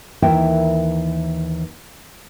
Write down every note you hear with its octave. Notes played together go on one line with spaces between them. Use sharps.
D#2 E3 E4 A#4 E5 G5